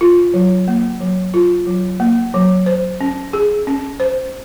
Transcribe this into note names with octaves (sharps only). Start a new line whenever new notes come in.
F4
F#3
A#3
F#3
F4
F#3
A#3
F#3
C5
C#4
G#4
C#4
C5